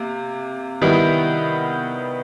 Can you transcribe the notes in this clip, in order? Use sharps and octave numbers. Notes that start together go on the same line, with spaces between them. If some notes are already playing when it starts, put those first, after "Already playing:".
Already playing: C3 A#3
D#3 G3 B3 E4